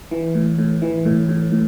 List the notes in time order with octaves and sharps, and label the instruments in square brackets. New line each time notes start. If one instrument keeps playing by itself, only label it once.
[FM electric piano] E3
A2
A2
E3
A2
A2
A2